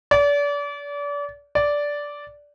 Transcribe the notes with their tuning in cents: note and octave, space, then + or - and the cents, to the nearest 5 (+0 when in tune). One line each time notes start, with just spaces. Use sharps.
D5 -35
D5 -10